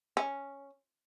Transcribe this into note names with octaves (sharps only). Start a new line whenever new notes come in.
C#4